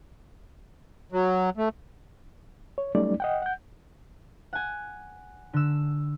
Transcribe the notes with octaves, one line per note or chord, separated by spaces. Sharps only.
F#3
A3
C#5
F#3 G3 A3 C#4 D#4 D5
D#5 F#5 G5
F#5 G6
F#5 G#5
D3 E6